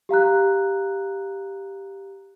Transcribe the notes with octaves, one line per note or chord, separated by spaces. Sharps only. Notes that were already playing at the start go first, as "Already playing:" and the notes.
G4 F5 A#5 F#6